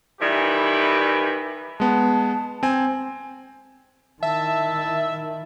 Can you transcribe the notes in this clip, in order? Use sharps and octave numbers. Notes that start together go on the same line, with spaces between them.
D#3 E3 G3 E4 G4 B4
G#3 B3 A5
C4 G#5
D#3 E4 E5 A5